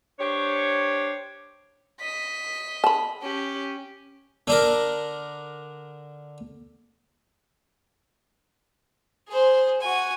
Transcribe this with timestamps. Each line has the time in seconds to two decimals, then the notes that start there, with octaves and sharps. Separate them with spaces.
0.20 D4 G4 C5 C#5
2.00 D#5 B6
2.84 A5 B5
3.22 C#4 G4
4.47 D3 D4 A#4
9.28 G#4 C5
9.81 F#4 G#5